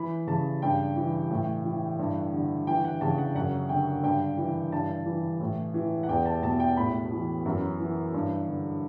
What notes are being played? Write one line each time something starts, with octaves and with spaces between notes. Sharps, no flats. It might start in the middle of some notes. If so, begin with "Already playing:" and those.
Already playing: E3 B5
C#3 A5
G2 G5
E3
A2
E3
G2
D3
E3 G5
F#5
C#3 A5
F#5
F#2 F#5
D3 G5
G2 G5
E3
G2 A5
E3
A2
E3
F#5
E2 G5
A5
B2 A5
G5
A2 B5
E3
F#2
E3
G2
D3